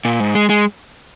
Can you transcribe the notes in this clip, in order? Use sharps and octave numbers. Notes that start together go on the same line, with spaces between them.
A#2
G#2
G#3
G#3